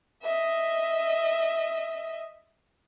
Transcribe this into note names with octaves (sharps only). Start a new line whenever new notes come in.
D#5 E5